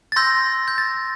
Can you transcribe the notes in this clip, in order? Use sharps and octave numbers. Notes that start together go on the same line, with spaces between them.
A6
C6 E6 G6 A#6
G6
A6